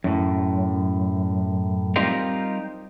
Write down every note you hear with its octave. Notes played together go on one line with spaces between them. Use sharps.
F#2 A2
G3 C4 D#4 F4 G4 A#4